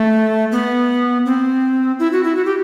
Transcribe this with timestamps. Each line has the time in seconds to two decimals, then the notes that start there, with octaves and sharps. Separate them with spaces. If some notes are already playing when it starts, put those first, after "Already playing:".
Already playing: A3
0.52 B3
1.26 C4
1.99 E4
2.12 F#4
2.24 E4
2.36 F#4
2.45 G4